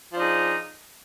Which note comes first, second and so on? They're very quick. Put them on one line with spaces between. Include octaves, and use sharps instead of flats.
F3 D4 D#4 G#4